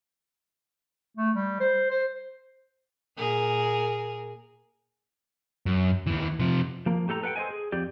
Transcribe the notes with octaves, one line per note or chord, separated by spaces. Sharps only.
A3
G3
C5
C5
A#2 G#4 A#4
F#2
D#2 E3
C3 F3
F3 A#3
A2 G4 A4 F#5 A#5
A4 B4 D5 F#5 G5
A4 C5 D5 D#5 G#5
G#4
F2 G4 D5